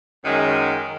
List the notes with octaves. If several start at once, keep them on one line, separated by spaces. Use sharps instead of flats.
F#2 D#3 G#3